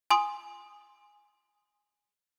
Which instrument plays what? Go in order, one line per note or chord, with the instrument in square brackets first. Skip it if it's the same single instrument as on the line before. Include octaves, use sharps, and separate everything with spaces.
[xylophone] G#5 C6 D#6